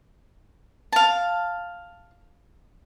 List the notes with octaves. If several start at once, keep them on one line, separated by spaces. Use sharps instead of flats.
F5 A5